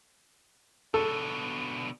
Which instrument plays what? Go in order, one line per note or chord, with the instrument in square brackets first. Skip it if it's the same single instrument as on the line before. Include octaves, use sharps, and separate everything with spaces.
[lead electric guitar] B2 D3 [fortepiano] A4